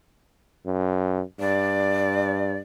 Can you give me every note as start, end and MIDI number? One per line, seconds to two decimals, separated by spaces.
0.66 1.22 42
1.40 2.60 43
1.40 2.59 74